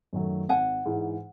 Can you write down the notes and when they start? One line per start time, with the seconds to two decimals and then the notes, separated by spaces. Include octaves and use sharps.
0.13 F#2 D#3 F#3 A3
0.49 G#1 F#5 G#5
0.86 G#2 E3 G#3